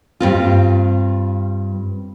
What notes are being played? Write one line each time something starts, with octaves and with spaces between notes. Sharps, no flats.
G2 C4 F4